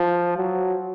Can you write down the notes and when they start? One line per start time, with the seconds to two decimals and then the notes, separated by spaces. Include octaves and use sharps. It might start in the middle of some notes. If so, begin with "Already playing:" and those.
Already playing: F3
0.37 F#3